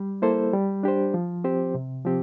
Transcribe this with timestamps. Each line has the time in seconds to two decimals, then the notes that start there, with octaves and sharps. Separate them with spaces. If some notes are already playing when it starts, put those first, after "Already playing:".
Already playing: G3
0.22 A#3 E4 A4 C5
0.53 G3
0.83 D4 G4 C5
1.14 F3
1.44 C4 G4 C5
1.75 C3
2.05 F3 C4 G4